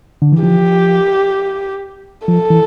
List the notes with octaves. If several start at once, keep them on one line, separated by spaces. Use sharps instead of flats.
D3
E3
F3 G4
F3 A4
E3